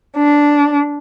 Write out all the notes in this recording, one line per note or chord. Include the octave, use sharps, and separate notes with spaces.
D4